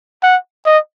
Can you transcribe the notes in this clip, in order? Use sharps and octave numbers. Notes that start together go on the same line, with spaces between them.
F#5
D#5